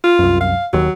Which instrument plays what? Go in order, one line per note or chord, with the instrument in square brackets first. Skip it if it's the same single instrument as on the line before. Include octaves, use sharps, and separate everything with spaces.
[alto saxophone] F4
[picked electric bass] C2 F#2
[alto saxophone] F5
[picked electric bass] D#1 D#2 [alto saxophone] F#3